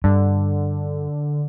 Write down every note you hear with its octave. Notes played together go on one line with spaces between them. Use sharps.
G2 D3